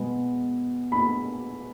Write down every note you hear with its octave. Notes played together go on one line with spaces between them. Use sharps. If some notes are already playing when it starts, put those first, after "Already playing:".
Already playing: B2 G#3 B3
B5